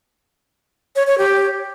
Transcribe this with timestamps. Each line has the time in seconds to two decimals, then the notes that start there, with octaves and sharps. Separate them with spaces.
0.96 C#5
1.07 C#5
1.18 G4